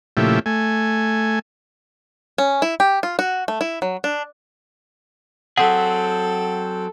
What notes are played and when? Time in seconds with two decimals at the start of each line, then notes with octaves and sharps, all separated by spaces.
0.17 A#2 C#3 F3 A3 E4 G4
0.46 A3 G#5
2.38 C#4
2.62 E4
2.80 G4
3.03 F4
3.19 F#4
3.48 A3
3.61 E4
3.82 F#3
4.04 D4
5.58 F#3 C4 G#4 A4 F#5